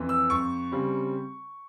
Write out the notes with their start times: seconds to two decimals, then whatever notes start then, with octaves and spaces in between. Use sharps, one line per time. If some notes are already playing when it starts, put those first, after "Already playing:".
Already playing: F2 E3
0.09 E6
0.30 F2 C#6
0.72 C#3 G3 C4